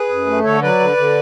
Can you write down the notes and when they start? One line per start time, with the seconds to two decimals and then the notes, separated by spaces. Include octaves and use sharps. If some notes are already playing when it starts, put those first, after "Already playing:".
Already playing: G#4 B4
0.09 F#2
0.26 A3
0.44 D3 A4 C#5
0.62 F#3 B4 D5
0.80 D3
0.97 D3